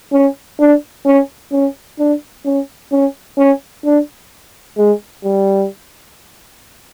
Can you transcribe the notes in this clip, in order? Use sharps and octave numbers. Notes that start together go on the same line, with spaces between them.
C#4
D4
C#4
C#4
D4
C#4
C#4
C#4
D4
G#3
G3